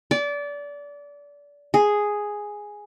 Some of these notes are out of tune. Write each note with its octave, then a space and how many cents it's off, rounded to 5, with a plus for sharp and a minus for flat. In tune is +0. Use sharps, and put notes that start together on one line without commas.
D5 -25
G#4 +0